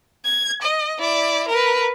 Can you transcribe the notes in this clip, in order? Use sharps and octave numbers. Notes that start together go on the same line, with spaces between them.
G#6
D#5
E4 D5
A#4 B4